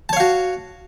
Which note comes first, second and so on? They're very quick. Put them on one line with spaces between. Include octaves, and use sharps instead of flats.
A5 C#5 F5 F#4